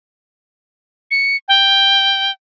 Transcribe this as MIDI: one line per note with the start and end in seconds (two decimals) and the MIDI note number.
1.11 1.36 97
1.48 2.31 79